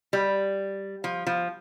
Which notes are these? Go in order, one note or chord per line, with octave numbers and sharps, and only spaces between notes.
G3
F3
F3